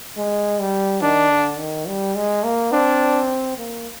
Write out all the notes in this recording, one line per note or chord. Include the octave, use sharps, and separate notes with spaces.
G#3
G3
D#3 D4
D3
D#3
G3
G#3
A#3
C4 D4
A#3